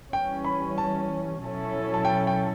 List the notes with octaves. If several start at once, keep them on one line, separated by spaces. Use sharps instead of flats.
E3 G3 C#4 G5
B5
A5
B2 F#3 C#4 E4 A4
A5
G5
G5